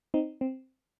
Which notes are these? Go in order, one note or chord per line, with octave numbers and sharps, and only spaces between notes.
C4 D#4
C4